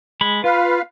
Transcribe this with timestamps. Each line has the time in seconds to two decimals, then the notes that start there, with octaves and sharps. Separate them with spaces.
0.21 G#3 B5
0.44 F4 B4 F5